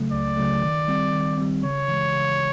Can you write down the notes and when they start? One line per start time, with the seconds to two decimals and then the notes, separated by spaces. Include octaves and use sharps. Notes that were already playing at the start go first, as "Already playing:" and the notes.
Already playing: C#3 F#3 A3
0.12 C#2 D5
0.37 C#3 F#3 A3
0.62 D#3
0.88 G3 C4
1.14 D#3
1.38 G3 C4
1.63 C#3 C#5
1.88 E3 G#3
2.14 C#3